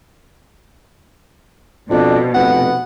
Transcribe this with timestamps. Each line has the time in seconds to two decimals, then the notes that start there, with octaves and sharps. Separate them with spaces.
1.90 F2 B2 D4
2.34 F1 B3 F#5